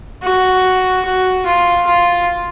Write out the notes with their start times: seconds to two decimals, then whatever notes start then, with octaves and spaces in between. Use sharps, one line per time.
0.23 F#4
1.05 F#4
1.46 F4
1.86 F4